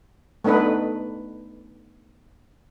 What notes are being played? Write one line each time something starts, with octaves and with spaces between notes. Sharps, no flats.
A3 B3 D4 D#4 B4